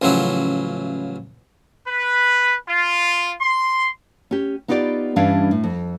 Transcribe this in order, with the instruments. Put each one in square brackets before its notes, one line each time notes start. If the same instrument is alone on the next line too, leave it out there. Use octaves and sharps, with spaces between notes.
[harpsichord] A1 C#3 F3 F#3 E4 F#4
[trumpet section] B4
F4
C6
[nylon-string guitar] C#4 G4
B3 D#4 F4 G4 D5
G2 E3 G3 C#4 D4 F5
A2
F2